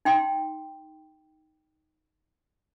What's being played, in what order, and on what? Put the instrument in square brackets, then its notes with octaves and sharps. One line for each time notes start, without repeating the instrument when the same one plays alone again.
[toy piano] D#4 G5 C6